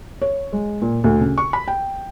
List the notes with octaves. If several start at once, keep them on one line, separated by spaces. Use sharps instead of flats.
C#5
G#3
A#2
D2
C#3
C#6
B5
G5